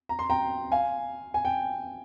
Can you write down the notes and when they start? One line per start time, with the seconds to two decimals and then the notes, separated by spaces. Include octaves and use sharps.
0.09 A#5
0.19 C6
0.30 G5 A#5
0.72 F5 G#5
1.34 G#5
1.45 G5